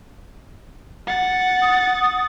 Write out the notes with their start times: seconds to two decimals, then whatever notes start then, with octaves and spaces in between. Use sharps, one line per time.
1.07 F#5 A6
1.61 D#6